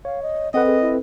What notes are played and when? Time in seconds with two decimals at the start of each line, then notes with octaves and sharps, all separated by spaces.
0.05 C#5 F5
0.22 D#5
0.54 C4 A4 B4 D#5 F#5
0.66 G#4
0.81 E4